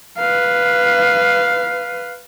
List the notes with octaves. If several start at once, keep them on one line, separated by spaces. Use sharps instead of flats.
B4 F5